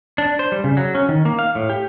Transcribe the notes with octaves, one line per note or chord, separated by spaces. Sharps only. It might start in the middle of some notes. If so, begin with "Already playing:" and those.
D4
C5
G3
C#3
F#3
C#4
D#3
A#3
F5
A2
G4